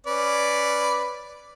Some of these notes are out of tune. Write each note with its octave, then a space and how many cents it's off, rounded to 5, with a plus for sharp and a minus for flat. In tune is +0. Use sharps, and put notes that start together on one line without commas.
C#4 +0 B4 +0 D5 +0